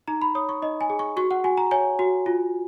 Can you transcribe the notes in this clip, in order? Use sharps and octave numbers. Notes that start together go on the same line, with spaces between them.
D#4 A#5
B5
C#5 D#6
C#6
D#4 D#5
G#5
G#4
C#6
F#4 C#6
F#5
F#4 G#5
A#5
C#5 G#5
F#4
F4